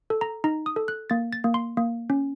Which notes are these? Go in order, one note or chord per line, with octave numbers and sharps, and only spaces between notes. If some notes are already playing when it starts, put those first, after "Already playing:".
A4
A#5
D#4 A#5
D#6
A4
F#6
A#3 A6
A6
A#3
C6
A#3
C#4